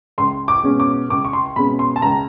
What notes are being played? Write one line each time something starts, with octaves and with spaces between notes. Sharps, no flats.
C#2 C6
D6
B2 G#3 C#4
D6
C#2 D6
C#6
C6
B2 G#3 C#4 B5
C6
A5
C#2 A#5